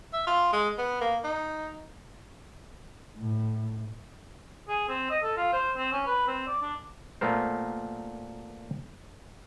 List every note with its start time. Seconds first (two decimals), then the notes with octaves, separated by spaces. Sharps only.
0.13 E5
0.27 F4
0.53 G#3
0.78 B3
1.01 A#3
1.24 D#4
3.18 A2
4.68 G#4
4.88 C4
5.10 D#5
5.23 A4
5.36 F4
5.52 C5
5.76 C4
5.92 C#4
6.07 B4
6.27 C4
6.47 D5
6.62 D4
7.21 A#2 A3 B3 A#4 C5